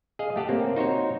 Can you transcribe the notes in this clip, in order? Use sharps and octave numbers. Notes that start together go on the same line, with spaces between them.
G#4 D#5 F5
A3 G4 F#5 A5
A#3 C4 C#5
D#4 F#4 C5 C#5